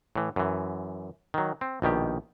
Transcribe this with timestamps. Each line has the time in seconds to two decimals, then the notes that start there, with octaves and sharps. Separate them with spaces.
0.16 A2 E3
0.36 F#2 E3
1.34 D#3 F#3
1.61 C4
1.82 A#1 B2 D#3 G4